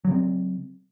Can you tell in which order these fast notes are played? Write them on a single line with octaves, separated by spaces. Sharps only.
F#3 C#3 C4